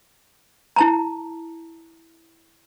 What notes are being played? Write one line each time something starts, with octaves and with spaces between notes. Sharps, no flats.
E4 A5 A#5